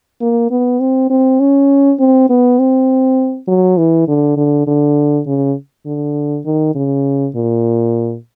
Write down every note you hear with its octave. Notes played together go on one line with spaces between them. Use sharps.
A#3
B3
C4
C4
C#4
C4
B3
C4
F#3
E3
D3
D3
D3
C#3
D3
D#3
C#3
A#2